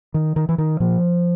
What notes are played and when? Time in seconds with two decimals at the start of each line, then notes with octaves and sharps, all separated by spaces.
0.14 D#3
0.36 D#3
0.49 E3
0.58 D#3
0.80 A#2 F3